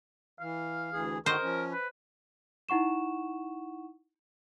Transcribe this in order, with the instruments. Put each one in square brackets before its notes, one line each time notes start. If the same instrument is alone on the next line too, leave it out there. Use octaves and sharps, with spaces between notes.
[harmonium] E3 [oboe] F5
[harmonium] D2 E3 G#4
[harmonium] D3 D#3 F#4 [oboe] A#4 [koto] C5 D#5
[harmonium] F3 C#4
[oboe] B4
[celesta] D#4 E4 F#5 C#6 E7